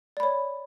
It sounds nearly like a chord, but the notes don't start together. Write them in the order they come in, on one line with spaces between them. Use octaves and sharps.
D5 B5 C#5